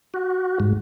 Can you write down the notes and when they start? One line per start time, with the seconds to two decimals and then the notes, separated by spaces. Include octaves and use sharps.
0.14 F#4
0.60 G#2